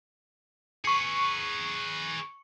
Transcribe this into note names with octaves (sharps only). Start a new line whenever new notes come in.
G#4 B4 C#6 C#7